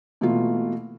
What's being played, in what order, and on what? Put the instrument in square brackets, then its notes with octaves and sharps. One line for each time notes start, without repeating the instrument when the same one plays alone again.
[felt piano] B2 E3 A3 A#3 F4